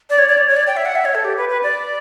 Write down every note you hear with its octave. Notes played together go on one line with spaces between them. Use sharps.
D5
C#5
D5
C#5
C#5
D5
G5
E5
F#5
E5
C#5
A4
G4
B4
B4
D5